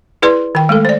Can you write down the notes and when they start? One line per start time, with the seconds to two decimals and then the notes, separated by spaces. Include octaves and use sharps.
0.22 E4 G#4 B4 D5 C6
0.55 D#3 G5
0.69 G#3 A3 A4
0.85 C5 D5